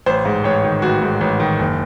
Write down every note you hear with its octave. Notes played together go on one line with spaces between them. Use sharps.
A1 C5
G#2
A1 C#5
D#3
A1 F#4
G#2
A1
D#3
F#1